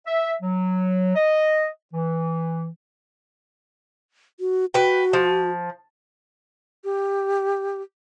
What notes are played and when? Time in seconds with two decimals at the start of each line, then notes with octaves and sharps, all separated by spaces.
0.06 E5
0.42 F#3
1.15 D#5
1.93 E3
4.40 F#4
4.74 F#4 B4 G5
5.13 F3
6.84 G4